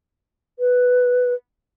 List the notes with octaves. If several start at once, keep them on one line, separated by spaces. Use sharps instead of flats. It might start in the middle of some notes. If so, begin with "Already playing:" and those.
B4